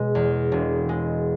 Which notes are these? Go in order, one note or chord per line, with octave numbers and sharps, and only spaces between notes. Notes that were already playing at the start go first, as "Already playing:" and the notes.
Already playing: B2 G#3
E2
E1
G#3